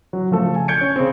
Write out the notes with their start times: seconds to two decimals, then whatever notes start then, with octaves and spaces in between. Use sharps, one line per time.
0.13 F#3
0.30 C#3 F3 A3 A4
0.55 G#5
0.68 G6 G#6 C#7 D7
0.81 C#4
0.96 C#3 C4